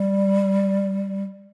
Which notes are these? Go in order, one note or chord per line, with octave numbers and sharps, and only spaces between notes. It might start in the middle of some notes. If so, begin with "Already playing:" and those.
Already playing: G3